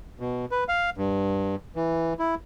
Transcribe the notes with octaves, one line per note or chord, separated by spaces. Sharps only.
B2
B4
F5
G2
E3
E4